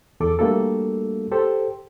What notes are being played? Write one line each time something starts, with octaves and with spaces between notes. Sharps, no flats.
E2 A4 D6
G3 A3 A#3 D4 F#4 A4
G4 A4 C5